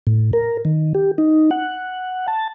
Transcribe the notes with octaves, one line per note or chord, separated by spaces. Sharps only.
A2
A#4
D#3
G4
D#4
F#5
A5